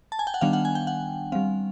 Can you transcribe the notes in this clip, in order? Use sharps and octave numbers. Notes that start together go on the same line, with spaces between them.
A5
G#5
G5
F#5
D#3 G3 B3 D4 F5
F#5
G#5
G5
F#5
G3 C4 F5